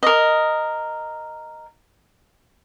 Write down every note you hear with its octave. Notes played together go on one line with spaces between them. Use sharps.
A#4 D#5